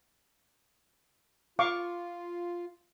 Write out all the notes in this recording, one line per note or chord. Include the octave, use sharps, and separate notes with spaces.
F4 F5 C#6 D6